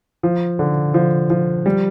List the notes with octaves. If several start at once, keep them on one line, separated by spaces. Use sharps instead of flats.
F3
D3
F3
F3
G3